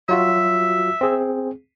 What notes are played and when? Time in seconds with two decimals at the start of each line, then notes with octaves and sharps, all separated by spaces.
0.09 F#3 F4 F#4 E5
1.01 C4 G#4